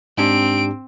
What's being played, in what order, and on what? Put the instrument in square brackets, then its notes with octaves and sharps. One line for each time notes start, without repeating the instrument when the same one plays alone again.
[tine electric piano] G#2 D4 G4 [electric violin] C4 D7